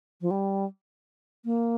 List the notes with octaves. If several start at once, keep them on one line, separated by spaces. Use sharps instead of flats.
F3
G3
A#3